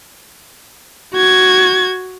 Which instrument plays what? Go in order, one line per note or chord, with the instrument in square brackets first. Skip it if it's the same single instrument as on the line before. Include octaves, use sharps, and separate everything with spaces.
[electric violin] F#4 G#6